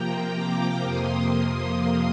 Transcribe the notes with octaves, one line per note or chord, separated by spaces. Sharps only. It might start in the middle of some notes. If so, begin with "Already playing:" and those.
Already playing: C3 F3 A#3 G5 A#5
A#5 D6
F2 C3 F3 A#3 C6 D#6